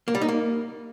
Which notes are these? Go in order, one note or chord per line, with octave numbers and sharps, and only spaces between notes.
A#3
G3
D#4
A#3